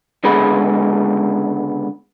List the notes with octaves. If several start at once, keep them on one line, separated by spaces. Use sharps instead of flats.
C#2 D3 G#3 B3 G#4 B5